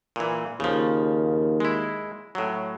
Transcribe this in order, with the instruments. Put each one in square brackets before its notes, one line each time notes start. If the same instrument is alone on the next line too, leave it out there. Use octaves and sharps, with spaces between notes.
[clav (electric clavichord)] A#2 E3
[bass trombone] D#2 [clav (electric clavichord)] C#3 F3
[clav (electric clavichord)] G#3 E4
A2 F#3